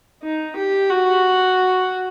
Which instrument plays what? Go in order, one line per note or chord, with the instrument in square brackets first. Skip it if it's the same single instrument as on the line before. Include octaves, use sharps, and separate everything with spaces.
[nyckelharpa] D#4
G4
F#4